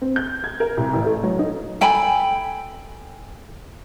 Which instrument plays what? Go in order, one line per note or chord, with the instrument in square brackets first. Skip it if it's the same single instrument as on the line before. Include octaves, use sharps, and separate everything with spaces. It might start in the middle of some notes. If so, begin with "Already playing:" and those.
[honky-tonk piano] C4
G6
G#6
A#4
C2
A1
A3
F#3
D#4
[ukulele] A4 G5 G#5 B5